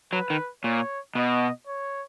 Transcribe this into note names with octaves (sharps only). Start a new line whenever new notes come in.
F#3 B4
D#3
A#2 C#5
B2 D#5
C#5